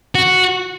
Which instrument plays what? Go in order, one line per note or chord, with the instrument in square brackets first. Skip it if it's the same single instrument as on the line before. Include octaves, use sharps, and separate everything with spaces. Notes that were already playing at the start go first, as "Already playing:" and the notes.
[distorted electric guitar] F#4